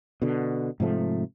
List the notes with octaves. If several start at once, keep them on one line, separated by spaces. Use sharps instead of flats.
B2 D3
G#2 C3 F3 A3